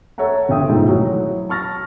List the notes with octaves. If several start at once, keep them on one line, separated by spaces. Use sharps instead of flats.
A4 C#5 E5 F#5 A#5
G1 C#3 E5 G5 D#6
G#2 B2 D#3 F3 G#3 A3
F#3 E4 F#4
A5 C#6 F6 A6 A#6